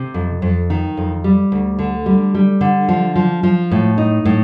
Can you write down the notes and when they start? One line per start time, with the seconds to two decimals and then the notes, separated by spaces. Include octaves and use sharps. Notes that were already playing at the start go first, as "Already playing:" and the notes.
Already playing: C3
0.14 F2
0.42 F2
0.70 D#3
0.97 F2
1.24 G3
1.52 D2
1.79 D3
2.06 G3
2.35 G3
2.61 D3
2.89 F3
3.16 F3
3.43 F3
3.71 A2
3.98 D#4
4.25 A2